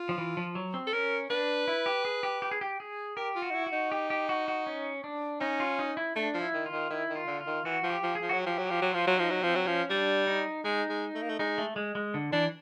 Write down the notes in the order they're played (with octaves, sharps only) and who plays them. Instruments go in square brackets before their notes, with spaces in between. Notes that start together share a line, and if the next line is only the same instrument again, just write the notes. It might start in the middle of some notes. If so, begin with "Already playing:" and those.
Already playing: [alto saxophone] F4
[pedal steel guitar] F3
E3
F3
F#3
C4
[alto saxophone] A4
[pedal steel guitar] C#4 [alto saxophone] A#4
[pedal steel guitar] D4 [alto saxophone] B4
[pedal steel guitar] E4
G4
G#4
G4
G4
G#4
G4
G#4
[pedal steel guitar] G4 [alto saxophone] A#4
[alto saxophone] F4
[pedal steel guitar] F#4
[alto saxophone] D#4
E4
[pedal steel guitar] F#4
[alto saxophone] D#4
[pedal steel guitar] G4
G4
F#4
F#4
C#4
D4
[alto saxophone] C#4 [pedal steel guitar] D#4
[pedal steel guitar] F4
D#4
E4
[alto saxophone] A3 [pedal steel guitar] D4
[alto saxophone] F3
[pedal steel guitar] E4
[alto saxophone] D#3
[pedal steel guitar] F4
[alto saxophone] D#3
[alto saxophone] D#3 [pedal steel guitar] E4
[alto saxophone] D#3
[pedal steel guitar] F4
[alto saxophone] D3
[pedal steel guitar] F4
[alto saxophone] D#3
[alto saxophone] E3 [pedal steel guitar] F#4
[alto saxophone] F3
[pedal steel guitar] G4
[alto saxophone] F3
[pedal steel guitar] G#4
[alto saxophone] F3
[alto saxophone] F#3 [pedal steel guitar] F#4
[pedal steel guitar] G4
[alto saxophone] F3
F#3
[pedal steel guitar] G4
[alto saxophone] F3
F#3
[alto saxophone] F3 [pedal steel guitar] F4
[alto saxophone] F#3
[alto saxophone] F3 [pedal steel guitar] D#4
[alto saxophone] F#3
[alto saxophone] F3 [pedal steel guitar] C4
[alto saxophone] F#3
[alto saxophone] F3 [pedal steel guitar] C#4
[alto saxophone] G3 [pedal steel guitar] D4
[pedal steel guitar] D#4
[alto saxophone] G#3 [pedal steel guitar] D#4
[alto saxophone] G#3
A3
A#3
A3
[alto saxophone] G#3 [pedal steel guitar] D#4
[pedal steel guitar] A3
G#3
G#3
D3
[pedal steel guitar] E3 [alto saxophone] D4